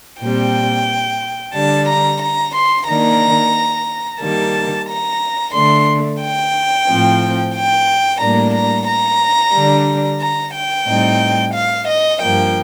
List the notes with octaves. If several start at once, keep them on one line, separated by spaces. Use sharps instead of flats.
A#2 G3 C4 G5
D3 G3 D4 A5
A#5
A#5
C6
D#3 A#3 D4 A#5
D#3 G3 A#3 A5
A#5
D3 A3 D4 C6
G5
A2 F3 C4
G5
A2 G3 A#3 D4 A#5
A#5
A#5
D3 G3 D4
A#5
G5
A2 G3 C4 D#4
F5
D#5
G2 F3 A#3 G5